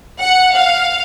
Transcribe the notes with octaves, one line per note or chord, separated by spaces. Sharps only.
F#5
F5